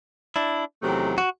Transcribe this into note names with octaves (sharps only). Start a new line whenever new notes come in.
D4 E4
E2 C3 D#3 F#3 A3
F#4